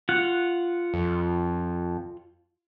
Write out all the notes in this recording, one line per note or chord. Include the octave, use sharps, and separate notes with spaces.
F4 F#5
F2